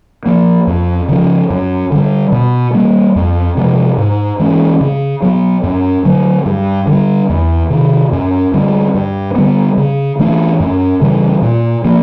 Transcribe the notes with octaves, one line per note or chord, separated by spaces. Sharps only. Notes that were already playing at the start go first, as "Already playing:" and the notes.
F3 A#3
F2
C#3 F3
F#2
D3 G3
B2
G3 A#3
F2
C3 F3 G#3
G#2
E3 G#3 C#4
C#3
F#3 B3
F#2
D3 F#3
G2
D3 G3
E2
C3 D#3
F#2
D3 G3 C4
G2
D3 G3 B3
C#3
E3 A3 D4
F#2
C#3 E3 G3
A#2
F3 A#3